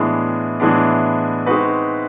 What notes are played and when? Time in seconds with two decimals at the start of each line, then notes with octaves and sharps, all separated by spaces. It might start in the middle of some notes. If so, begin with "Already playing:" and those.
Already playing: A2 E3 G#3 B3 D4
0.60 A2 E3 G#3 B3 D4
1.46 G#3 C4 D#4 F#4 B4